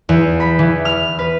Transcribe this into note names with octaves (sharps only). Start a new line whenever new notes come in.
E2
B5
E3
F6
B4